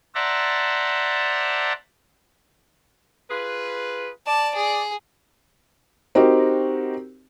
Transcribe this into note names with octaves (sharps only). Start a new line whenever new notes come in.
C5 D5 E5 F#5 A5 A#5
F4 G#4 B4
D5 A5
G#4
C4 D#4 F#4 G4 A#4